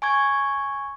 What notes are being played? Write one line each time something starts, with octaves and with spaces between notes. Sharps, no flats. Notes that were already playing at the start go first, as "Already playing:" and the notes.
G#5 C#6 G#6